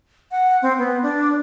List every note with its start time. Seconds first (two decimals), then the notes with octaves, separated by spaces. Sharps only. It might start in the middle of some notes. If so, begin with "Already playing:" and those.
0.31 F#5
0.62 C4
0.78 B3
1.03 D4